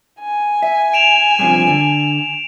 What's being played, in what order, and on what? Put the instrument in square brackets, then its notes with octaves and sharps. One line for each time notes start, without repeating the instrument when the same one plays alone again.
[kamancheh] G#5
[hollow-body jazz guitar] E5
[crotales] D7 E7 F7
[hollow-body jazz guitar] G2 C3 F3
D3